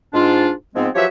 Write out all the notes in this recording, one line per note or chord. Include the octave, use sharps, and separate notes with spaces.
G#2 D4 F4
G#2 F3 G#3 B3 C4
F3 F#3 G4 B4 C#5 E5